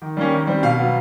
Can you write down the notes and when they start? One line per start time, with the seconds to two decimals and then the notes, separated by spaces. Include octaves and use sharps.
0.02 D#3
0.17 G3 A#3 C#4
0.33 D#3
0.47 G3 C4
0.63 B2 F5
0.79 F#3 B3